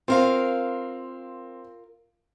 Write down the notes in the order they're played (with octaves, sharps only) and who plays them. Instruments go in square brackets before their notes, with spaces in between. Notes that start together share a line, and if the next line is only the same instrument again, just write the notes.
[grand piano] C4 [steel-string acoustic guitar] F4 A#4 F5